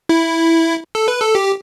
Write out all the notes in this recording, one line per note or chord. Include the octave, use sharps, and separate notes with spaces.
E4
A4
B4
A4
G4